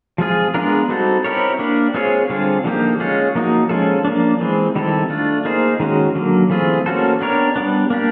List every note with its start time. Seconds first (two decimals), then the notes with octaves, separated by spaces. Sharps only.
0.18 F3 G#3 C4 F4 G#4
0.54 G#3 B3 D4 F4 A#4
0.89 G3 C4 D#4 F#4 A4
1.24 C4 E4 G4 A#4 C#5
1.59 A#3 D4 G4
1.94 G#3 C4 F4 G#4 C#5
2.30 D3 G3 C4 F4 G#4
2.64 D3 F3 A#3 D#4 G4
3.00 G#3 C#4 F4 G#4 C#5
3.35 F3 A#3 D#4 F#4
3.69 F3 G#3 C#4 F4 A4
4.05 F3 A#3 D4
4.40 E3 G#3 C4
4.75 D#3 G3 C4 E4 A4
5.10 A3 D4 F4
5.45 A#3 D#4 G#4 C5
5.80 D#3 G#3 C#4 F#4
6.15 D3 F#3 A#3
6.50 E3 A3 C4 F4 G#4
6.86 A#3 C#4 F#4 A4 C5
7.21 B3 D4 G4 A#4 C#5
7.56 G3 B3 D4
7.90 A#3 D4 G4